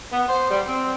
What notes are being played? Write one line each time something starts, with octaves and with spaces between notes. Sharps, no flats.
B3
C5
G3
C4